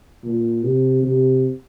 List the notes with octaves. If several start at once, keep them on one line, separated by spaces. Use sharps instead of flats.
A#2
C3
C3